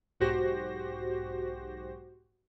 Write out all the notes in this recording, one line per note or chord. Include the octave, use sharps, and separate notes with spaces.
B1 G#2 F#4 G4 C5 A#6